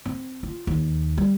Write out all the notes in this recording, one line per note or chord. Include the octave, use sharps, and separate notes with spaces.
C4
F4
D#2
G3